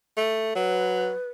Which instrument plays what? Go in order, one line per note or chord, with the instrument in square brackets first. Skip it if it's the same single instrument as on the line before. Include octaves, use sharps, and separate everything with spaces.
[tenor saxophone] A3
[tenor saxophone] F#3 [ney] B4